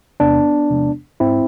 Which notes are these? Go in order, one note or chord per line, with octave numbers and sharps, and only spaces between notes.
E2 C3 G#3 B3 D4
E2 C3 F3 G#3
G#2 G#3 C4 E4